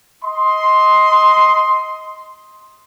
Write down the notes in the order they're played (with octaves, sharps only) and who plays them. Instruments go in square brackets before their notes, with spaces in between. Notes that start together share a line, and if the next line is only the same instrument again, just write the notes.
[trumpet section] D#5 C6